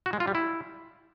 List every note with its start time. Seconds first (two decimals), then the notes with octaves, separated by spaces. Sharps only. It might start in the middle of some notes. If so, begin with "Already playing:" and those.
0.06 F#4
0.13 G#3
0.20 F4
0.28 G3
0.35 E4